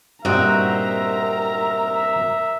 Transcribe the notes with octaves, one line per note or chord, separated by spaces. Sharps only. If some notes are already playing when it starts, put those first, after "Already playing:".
G2 A#2 C4 D#4 F#4 A#4 E5 A#5